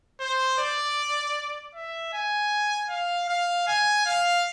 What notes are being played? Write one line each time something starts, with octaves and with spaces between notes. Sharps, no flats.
C5
D5
E5
G#5
F5
F5
G#5
F5